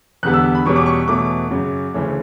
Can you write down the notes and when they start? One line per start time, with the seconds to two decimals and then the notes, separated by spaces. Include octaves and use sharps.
0.23 E2 D3 G3 B3 F#6
0.34 E6
0.55 B5
0.66 E2 B2 G3 C#4 C#6
0.76 D6
0.86 C#6
1.08 E2 B2 A3 C#4 D6
1.50 F#2 C#3 F#3
1.94 D2 C#3 E3 A3 C#4